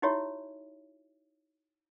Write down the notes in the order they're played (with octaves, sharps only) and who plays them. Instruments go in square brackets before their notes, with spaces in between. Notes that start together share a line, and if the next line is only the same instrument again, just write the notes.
[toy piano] D#4 E4 F#4 G4 C#5 E5